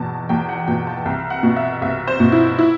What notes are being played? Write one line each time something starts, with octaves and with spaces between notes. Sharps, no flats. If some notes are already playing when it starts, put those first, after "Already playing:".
Already playing: E2 B2 A5
E2 G5
F#5
B2 G5
A5
C2 G5
F#5
B2
E5
C2 E5
C5
B2
E4
E4